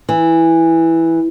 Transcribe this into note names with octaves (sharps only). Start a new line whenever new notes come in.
E3